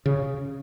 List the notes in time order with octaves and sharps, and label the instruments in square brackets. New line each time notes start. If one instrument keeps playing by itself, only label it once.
[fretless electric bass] C#3